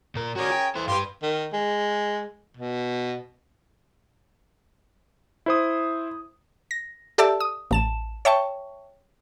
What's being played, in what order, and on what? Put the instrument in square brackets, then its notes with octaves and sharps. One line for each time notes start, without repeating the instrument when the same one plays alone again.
[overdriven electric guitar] A#2 A#4
[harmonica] C#4 G#4 A#4 [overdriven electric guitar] F#4 D5
[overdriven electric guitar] G5
[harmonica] E3 [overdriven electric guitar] A4 C5
[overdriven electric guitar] G2 B4 [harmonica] G4 F5 C6
[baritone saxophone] D#3
G#3
B2
[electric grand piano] E4 C5 D#6
[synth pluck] A#6
G4 A4 D5 E5 A5 E6
D#6
A1 A5 E7
C#5 E5 G5 A5 C#6